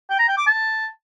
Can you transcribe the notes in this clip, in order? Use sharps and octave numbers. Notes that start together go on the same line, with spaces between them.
G5
A#5
G5
D6
A5